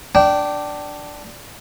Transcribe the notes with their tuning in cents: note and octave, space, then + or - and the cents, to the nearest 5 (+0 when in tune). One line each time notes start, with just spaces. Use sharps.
D4 +0 G5 -20